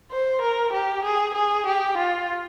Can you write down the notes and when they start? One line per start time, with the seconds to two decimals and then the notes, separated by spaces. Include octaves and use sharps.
0.11 C5
0.42 A#4
0.73 G4
1.04 G#4
1.35 G#4
1.67 G4
1.98 F4